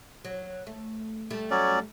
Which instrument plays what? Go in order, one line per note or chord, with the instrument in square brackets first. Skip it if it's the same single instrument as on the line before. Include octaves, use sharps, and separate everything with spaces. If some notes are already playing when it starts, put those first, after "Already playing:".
[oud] F#3
A3
G3 A3
[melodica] F#3 C#4 D5